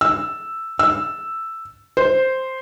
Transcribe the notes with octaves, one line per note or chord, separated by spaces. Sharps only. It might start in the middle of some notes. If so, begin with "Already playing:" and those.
E6
E6
C5